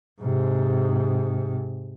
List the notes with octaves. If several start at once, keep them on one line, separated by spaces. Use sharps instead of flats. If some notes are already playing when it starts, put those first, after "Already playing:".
G#2 C3